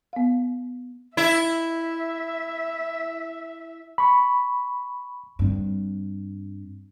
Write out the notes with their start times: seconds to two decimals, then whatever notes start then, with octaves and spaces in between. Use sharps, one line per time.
0.13 B3 F5
1.17 E4 E5
3.98 B5 C#6
5.39 G2 C4